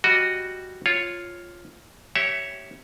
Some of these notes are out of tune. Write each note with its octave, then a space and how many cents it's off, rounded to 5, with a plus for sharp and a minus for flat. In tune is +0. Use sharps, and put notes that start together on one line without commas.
G3 +0 F#4 +0 D#5 +0
F4 +0 C#5 -5
G4 -30 C#5 +0 E5 +0